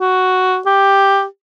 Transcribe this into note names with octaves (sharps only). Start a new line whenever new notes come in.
F#4
G4